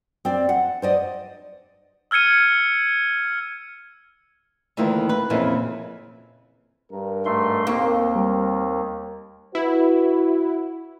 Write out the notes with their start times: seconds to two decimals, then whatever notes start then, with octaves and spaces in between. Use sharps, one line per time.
0.25 C4 D5
0.49 F#5
0.82 C5 D5 D#5
2.11 E6 F6 G#6 C#7 D#7
4.77 D2 D#3 E3 A#3 F4
5.09 B4
5.30 F2 A#2 C#3 E3 E4
6.91 G2 A#4
7.25 G#2 A3 C6
7.67 D#2 A#3 C4 A#4 C#6
8.15 G3
9.55 E4 F#4 B4